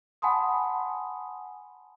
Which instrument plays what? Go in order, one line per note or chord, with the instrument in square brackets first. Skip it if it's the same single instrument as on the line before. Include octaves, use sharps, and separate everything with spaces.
[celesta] F#5 G#5 A5 B5 C6 D#6